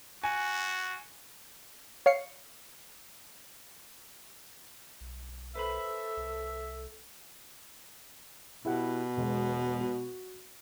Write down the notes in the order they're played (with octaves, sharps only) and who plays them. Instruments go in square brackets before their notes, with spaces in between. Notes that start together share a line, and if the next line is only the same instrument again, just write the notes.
[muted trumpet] F#4 [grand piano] G#5
[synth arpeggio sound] C#5 F5 C7 C#7
[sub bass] B1
[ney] A4 [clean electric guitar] B4 C5 B5 [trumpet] E5
[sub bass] C2
[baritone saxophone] B2 [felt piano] E4 G4 F#5
[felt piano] E1 G#3
F#4